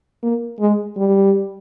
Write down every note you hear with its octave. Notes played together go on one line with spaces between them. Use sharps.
A#3
G#3
G3